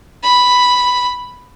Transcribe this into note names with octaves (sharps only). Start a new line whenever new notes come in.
B5